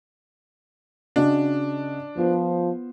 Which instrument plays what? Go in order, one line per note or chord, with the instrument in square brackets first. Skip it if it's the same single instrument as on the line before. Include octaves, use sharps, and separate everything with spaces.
[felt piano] C#3 F#4 D#5 [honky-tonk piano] D4
[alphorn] F3 [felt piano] B3 F4 C5